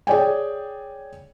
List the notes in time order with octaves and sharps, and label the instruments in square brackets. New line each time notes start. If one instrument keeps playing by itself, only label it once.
[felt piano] G#4 C#5 D5 G5 G#5